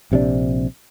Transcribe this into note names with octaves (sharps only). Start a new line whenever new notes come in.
A#1 C3 D#3 D4